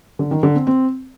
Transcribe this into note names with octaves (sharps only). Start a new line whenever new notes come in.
D3
D#3
D3
C4
C4